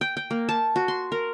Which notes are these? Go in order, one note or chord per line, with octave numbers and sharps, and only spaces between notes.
G5
G5
A#3
A5
F#4
C6
A#4